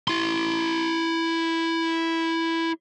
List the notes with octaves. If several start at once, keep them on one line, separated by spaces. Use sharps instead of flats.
E4 C6